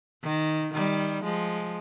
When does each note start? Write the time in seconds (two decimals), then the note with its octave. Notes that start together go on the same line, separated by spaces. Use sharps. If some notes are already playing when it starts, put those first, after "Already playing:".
0.23 D#3
0.73 D#3 G3
1.24 F3 G#3